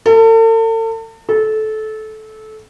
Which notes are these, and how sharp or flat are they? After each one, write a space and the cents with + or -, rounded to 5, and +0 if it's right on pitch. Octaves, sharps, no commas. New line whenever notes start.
A4 +40
A4 -20